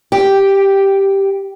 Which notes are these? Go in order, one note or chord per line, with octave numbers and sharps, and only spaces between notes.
G4